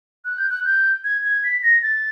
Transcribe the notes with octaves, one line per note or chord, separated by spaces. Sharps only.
F#6
G6
F#6
G6
G#6
G#6
B6
A#6
A6